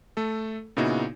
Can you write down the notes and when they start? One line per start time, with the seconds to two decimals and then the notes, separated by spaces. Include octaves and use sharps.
0.17 A3 A4
0.77 A#2 C#3 B3 D#4 E4 F#4